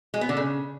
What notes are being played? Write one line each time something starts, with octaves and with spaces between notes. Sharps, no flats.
G#3
B3
D3
C#3